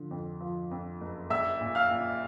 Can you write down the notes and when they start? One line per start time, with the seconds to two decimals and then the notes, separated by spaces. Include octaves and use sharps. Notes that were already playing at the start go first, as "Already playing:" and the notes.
Already playing: D3 F3
0.11 F2
0.41 F3
0.71 F2
1.01 F#1
1.30 A#1 E5 E6
1.61 A#2
1.75 F5 F6
1.91 A#2